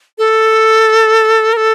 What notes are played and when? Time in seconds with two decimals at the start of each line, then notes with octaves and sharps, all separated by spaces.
0.18 A4
1.53 A#4
1.57 A4